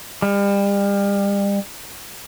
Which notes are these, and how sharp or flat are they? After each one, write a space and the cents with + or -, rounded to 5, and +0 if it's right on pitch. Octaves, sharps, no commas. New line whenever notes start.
G3 +35